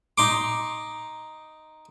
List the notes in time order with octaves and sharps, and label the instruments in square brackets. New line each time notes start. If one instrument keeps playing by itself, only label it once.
[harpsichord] D#4 C6 D6